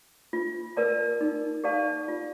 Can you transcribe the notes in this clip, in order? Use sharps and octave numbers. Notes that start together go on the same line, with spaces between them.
F4
A#4 D5 A5
D#4
G4 D5 F5 A5
F4